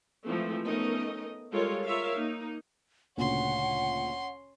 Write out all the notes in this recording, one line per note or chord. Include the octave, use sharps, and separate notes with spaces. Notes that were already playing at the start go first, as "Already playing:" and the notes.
E3 F3 G#3 A3 C4
A3 B3 C#4 D#4 A#4 D#5
G3 G#3 F4 A4 A#4 C#5
F4 A#4 C#5 E5 F5
A#3 D#4
D2 A#2 C#3 C#4 F#5 C6